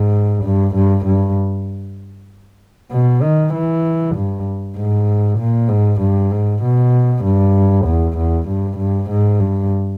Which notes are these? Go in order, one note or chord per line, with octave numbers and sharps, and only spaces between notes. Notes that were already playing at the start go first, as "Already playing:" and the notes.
Already playing: G#2
G2
G2
G2
B2
D#3
E3
G2
G#2
A#2
G#2
G2
G#2
B2
G2
E2
E2
G2
G2
G#2
G2